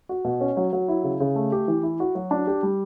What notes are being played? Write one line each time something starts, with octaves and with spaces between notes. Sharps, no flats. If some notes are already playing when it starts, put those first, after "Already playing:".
F#4
B2
C#4
F#3
F#3
E4
C#3
C#3
A3
G4
E3
E4
F#4
F#3
D4
G4
G3